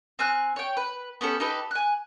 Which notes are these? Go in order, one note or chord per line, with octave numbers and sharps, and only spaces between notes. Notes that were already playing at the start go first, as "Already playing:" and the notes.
C4 G#5 F6 F#6
C#5 G5
B4
B3 C#4 G4 A4
D#4 G4 A4 B4
G#5 F#6